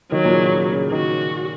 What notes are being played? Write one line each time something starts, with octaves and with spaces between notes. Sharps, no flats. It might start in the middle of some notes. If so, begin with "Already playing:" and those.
D#3 F#3
A#2
C#3
C#3
C#3
D#3 F#4